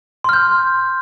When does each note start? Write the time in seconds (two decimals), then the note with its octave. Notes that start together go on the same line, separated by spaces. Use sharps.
0.24 C6
0.29 F6
0.33 G6